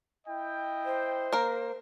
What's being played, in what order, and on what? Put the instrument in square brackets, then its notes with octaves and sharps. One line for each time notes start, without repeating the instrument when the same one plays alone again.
[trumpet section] E4 D#5 G5
[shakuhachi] C5
[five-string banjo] A#3 A#4